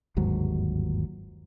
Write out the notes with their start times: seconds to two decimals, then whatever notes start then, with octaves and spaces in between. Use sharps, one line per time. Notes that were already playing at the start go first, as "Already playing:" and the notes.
0.17 G1 D#2 G#2 F#3